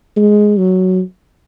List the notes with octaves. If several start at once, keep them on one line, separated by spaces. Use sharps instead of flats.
G#3
F#3